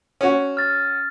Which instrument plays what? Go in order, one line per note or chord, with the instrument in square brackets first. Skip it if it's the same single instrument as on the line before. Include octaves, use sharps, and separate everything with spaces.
[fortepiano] C#4 F#4
[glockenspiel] F6 A6